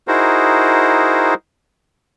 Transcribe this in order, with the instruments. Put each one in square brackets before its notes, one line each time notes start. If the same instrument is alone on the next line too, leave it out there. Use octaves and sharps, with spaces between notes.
[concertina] D#4 E4 F#4 G#4 A#4 C5